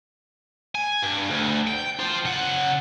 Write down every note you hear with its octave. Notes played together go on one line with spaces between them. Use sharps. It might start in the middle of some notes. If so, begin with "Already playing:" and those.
G#5
G2
D2
G5
F4 C5
C#3 F#5